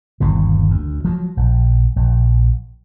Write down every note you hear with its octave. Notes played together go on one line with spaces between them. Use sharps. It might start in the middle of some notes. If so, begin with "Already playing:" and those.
G1 D#2 B2
D2
F3 F#3
A#1
A#1